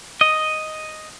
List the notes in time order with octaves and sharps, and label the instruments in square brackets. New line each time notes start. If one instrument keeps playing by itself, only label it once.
[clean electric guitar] D#5